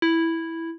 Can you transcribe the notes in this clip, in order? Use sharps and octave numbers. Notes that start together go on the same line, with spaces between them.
E4